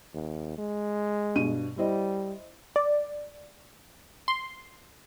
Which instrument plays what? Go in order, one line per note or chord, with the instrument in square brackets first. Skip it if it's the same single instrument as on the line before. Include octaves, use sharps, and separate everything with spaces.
[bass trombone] D#2
G#3
[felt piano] G2 B2 D#7
[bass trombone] G3 [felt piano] E4 C5 D#5
[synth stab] D5
C6